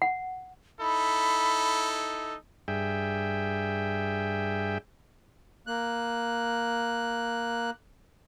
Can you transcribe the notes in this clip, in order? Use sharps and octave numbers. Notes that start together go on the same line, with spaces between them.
F#5
D#4 E4 A4 B5
G2 G#4 E5 G5
A#3 F#6